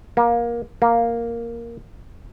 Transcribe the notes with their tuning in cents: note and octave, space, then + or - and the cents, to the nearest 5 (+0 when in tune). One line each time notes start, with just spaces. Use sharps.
A#3 +20
A#3 +0